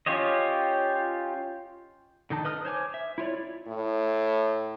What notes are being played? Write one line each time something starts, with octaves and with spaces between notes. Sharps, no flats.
C#4 F4 G4 C#5 D#5
D3 D#3 D#4 A5
B4 D#5 D#6 F6
C5 C#5 G#5 D6
E5
E4 F4 C#5 D5
A2